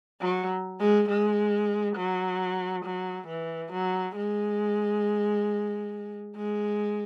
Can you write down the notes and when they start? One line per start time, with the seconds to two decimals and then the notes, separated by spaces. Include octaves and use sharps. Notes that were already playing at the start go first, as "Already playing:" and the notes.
0.22 F#3
0.80 G#3
1.09 G#3
1.97 F#3
2.85 F#3
3.28 E3
3.73 F#3
4.16 G#3
6.36 G#3